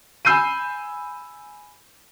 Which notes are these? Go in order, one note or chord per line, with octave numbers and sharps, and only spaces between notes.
G#5 B5 E6 G6 C7 D#7